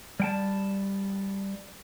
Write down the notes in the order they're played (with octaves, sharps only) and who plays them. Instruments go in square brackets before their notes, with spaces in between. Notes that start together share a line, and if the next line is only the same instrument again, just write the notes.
[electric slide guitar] G3 G5 A5